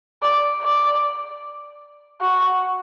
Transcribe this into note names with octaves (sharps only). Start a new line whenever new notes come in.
D5
D5
F#4